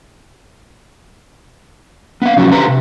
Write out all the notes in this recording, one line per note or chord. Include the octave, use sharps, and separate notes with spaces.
B3 F5
C3 F3 F#3 C#4 D#4 F#4
D3 G4 B4 C5 A#5 C6
D2 C3